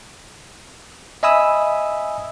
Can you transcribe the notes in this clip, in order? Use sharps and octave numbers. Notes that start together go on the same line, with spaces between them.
D#5 E5 G#5 B5 D#6 E6